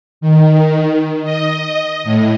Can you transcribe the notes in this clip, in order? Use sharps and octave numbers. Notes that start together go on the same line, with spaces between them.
D#3
D#5
A2